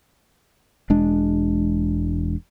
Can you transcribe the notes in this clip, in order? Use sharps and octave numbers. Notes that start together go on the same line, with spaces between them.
E1 G#3 D4